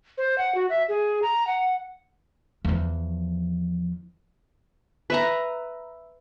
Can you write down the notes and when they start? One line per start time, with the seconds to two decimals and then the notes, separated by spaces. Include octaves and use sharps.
0.18 C5
0.38 F#5
0.55 F#4
0.70 E5
0.88 G#4
1.22 A#5
1.47 F#5
2.65 E2 F3
5.10 B4 E5 A#5